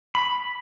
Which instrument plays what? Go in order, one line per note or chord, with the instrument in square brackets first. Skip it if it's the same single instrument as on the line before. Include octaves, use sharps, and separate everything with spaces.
[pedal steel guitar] B5